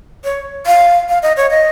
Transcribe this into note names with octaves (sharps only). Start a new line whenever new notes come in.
C#5
F5
F5
D#5
C#5
D#5